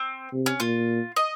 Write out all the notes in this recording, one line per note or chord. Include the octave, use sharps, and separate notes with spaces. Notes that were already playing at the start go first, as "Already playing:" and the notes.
Already playing: C4
C3
C#4
A#2 F4
D#5